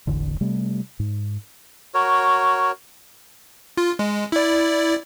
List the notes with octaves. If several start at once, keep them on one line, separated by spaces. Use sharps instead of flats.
E1 A1 E2 D3
C3 G3 A3
G#2
F#4 A#4 C#5
F4
G#3
E4 D5